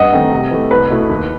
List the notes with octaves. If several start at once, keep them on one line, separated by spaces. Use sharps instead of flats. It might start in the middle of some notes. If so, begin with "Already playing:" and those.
Already playing: G2 D#5 F#5
D#3 A3 C4 D#4
C3
E3 A3
C2 B4
B2 A3 E4
D#2